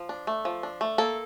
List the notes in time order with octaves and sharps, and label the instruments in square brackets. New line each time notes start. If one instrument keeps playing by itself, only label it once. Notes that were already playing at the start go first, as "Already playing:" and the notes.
Already playing: [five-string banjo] F3
D4
A3
F3
D4
A3
A#3 A4